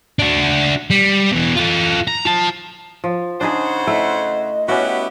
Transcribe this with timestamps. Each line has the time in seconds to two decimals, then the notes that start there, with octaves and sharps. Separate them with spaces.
0.19 D4 F#4
0.90 G3
1.31 B2 E3
1.56 F4 A4
2.08 A#5
2.26 F4 A5
3.04 F3
3.41 C#3 D4 D#4 G#4 C5 F#5
3.87 A3 E4 D#5
4.68 B3 C#4 E4 F#4 G4